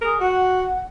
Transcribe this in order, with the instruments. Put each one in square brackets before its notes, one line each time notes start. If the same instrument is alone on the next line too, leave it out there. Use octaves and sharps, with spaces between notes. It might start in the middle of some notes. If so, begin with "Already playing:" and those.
[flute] G#4 [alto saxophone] A#4
[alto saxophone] F#4 [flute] F#5